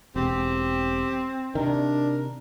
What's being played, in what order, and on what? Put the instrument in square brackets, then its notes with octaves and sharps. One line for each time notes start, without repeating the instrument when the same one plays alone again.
[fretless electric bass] E1 [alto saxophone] C4 [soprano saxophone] G4
[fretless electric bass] C3 D#3 [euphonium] D4 [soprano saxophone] A#4